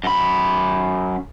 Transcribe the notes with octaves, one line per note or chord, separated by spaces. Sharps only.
F#2 B5